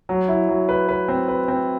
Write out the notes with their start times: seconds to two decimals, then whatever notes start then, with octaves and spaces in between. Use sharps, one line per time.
0.09 F#3
0.28 E4
0.49 F#3
0.69 B4
0.89 B4
1.08 C4
1.28 B4
1.48 C4